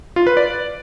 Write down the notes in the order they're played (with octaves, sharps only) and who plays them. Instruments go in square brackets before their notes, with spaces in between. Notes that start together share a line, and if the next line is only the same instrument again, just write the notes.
[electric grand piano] F4
B4
D5